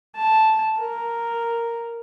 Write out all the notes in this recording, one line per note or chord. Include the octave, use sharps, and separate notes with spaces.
A5
A#4